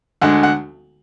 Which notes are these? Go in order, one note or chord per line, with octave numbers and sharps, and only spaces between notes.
D2 D3 G#3 F#5
F#5